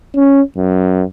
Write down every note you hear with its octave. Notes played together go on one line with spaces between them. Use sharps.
C#4
F#2